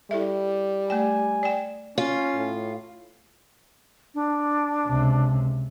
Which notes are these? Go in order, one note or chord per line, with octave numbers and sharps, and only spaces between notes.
G3 E4 A4 E5
A3 D5 G5 G#5
D5 G5
C#4 F4
A2
D4
C#2 C3